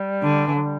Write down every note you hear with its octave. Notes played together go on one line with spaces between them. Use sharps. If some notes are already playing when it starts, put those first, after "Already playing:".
Already playing: G3
D3
E3
F#3
G3